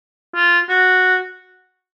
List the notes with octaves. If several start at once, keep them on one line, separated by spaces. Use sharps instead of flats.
F4
F#4